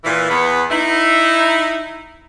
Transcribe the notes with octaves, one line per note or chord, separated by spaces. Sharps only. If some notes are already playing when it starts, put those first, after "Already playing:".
A#2 E3
E2 B3
D#4 E4